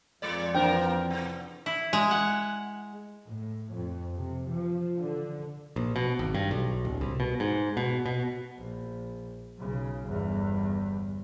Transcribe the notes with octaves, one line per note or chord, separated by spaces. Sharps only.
F2 A#2 G#3 D5
E3 A#3 D4 A#4 C5 G5
C3
E4
G#3
F#5
A2
F2
C3
F3
D3
A#1
B2
G#1
G2
B1
D1
C2
B2
G#2
B2
B2
A#1
B1 C#3
G1 E2